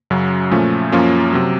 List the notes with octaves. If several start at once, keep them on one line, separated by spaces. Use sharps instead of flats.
F#2 C#3 F#3
A#2 F3 A3 C#4
F#2 F3 A#3 C#4 F4
C3 F#3